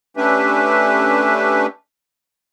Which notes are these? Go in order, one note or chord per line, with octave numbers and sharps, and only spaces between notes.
A3 C#4 D4 G4 B4 E5